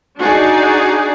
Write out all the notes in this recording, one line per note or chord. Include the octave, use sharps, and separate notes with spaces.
D4 D#4 F#4 G#4 D5